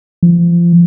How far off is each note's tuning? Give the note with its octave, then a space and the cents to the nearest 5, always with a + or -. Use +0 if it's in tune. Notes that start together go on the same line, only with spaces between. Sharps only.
F3 -25